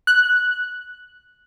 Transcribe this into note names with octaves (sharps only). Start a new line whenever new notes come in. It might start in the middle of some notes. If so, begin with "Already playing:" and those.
F#6